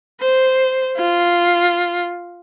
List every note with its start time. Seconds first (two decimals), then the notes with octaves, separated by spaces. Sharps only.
0.21 C5
0.97 F4